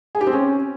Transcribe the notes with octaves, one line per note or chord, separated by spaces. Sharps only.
G#4
G4
C4
C#4